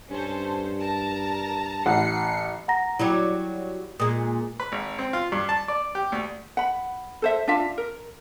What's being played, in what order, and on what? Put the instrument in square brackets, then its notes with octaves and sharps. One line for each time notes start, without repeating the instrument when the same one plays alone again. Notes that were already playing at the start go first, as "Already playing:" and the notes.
[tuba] G2 [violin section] C#4 A4 C5
[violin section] A#4 A5 A#5
[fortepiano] A1 F#5 [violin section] C7 C#7
[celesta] F#5 A#5 A#6
[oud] F#3 G3 G4 [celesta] E4
[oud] A#2 G#3 [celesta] D#6
[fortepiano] B4
G#1
C4
F4
G2
A5
D5
G4
D2
[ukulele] F#5 B5
A4 C5 E5
D4 F4 E5 F5
A#4